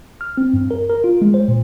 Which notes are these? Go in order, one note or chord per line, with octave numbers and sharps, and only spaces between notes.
F6
C4
G2
A#4
A#4
F4
G#3
C5
A#2